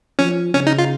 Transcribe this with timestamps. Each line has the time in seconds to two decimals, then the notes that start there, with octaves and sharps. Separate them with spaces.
0.19 F3 C#4
0.54 C#3 C#4
0.67 D#4
0.78 F4